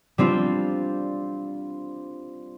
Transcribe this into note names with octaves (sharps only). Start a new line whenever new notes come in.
G3 C4 D4 F4